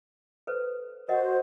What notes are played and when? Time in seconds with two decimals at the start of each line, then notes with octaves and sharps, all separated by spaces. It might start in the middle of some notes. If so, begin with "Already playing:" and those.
0.47 A4 B4 C5
1.09 F#4 A#4 C5 D#5 F#5